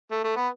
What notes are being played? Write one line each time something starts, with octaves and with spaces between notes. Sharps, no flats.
A3
A3
B3